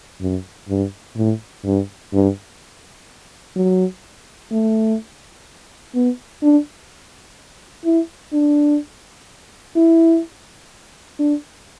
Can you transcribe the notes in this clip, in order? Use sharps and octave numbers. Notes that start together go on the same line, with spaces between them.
F#2
G2
A2
G2
G2
F#3
A3
B3
D4
E4
D4
E4
D4